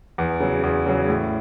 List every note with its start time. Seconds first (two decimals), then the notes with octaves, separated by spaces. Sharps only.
0.18 E2
0.40 C#3 F#3
0.63 E2
0.86 C#3 F#3
1.08 A2